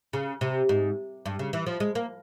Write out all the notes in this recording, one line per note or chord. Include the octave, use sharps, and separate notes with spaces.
C#3
C3
G#2
G2
C#3
E3
F3
G#3
A#3